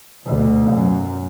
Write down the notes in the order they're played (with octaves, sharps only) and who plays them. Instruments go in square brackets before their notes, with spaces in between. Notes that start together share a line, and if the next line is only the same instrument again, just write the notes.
[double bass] D2 B2
F#2